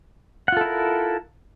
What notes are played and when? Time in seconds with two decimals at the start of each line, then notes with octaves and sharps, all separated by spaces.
0.48 F#5
0.52 F4
0.57 A4
0.61 E4
0.65 A#4